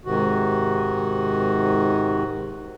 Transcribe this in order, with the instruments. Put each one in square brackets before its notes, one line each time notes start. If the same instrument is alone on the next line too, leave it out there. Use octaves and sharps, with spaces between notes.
[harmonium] G#2 C3 D#3 F#4